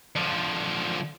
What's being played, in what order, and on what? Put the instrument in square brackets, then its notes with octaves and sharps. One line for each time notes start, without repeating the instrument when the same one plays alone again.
[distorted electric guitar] D3 F3